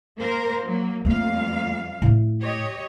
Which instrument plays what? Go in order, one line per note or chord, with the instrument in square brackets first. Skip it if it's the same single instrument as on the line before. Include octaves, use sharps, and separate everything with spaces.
[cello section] A#3 A#4 C5
F#3 A#3
[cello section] F2 G3 F5 [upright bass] A3 A#3
[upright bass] A2 A3
[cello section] G4 C#5 D#5